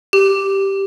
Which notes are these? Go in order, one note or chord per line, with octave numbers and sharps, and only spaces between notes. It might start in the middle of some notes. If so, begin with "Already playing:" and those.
G4